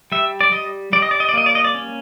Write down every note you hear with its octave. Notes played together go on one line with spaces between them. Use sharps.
G3 E5
D5
G3 D#5
G3 D5
D#5
D5
D#5
D5
A#3 D#5
D5
D#5
D5
C#4